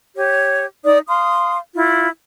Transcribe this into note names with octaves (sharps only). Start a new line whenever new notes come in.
G4 C#5
D#4 D5 D#6
F5 C6 D#6
E4 F4